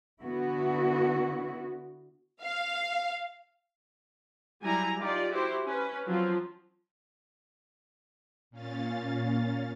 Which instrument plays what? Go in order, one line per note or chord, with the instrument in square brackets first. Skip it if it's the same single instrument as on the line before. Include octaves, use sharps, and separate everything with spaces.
[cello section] D3 B3 E4 F#4
[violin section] F5
[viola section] F#3 G3 E4 G#5 A#5
D#4 F4 G4 D5
E4 F#4 G4 C5
C#4 B4
F3 F#3 C4 F4
[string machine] A#2 C#4 F5 A6